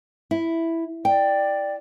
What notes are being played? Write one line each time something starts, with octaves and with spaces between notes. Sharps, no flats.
E4
D5 G5